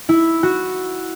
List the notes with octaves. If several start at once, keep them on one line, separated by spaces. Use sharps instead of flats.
E4
F#4